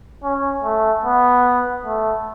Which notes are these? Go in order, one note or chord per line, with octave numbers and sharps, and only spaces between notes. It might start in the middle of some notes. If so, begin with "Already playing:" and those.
C#4
A3
B3
A3